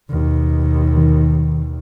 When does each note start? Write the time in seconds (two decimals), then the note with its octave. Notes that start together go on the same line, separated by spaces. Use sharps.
0.10 D#2 B2
0.97 D#3